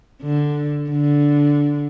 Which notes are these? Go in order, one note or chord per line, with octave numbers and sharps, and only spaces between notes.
D3
D3